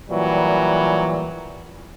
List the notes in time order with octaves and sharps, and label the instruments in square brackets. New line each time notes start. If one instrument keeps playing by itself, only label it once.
[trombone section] A#2 E3 F#3 G3